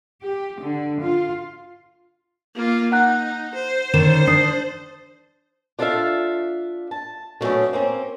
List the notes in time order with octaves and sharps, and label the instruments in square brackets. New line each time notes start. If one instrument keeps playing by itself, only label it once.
[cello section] G4
D3
F4
[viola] A#3 F4
[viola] D#4 [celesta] F#5 A#5 F#6
[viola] C5
[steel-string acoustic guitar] D3 D#3 C#4 [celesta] E7
[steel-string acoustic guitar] D4 [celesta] D#6 C7
[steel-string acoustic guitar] D4 F4 A4 B4 E5 F5
A5
D3 F#3 A3 B3 C#4 D4
A#3 C4 C#4